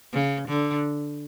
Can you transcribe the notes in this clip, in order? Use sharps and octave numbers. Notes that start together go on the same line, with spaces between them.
C#3
D3